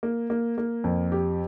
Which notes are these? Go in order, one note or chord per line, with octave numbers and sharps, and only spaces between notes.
A#3
A#3
A#3
F2
G4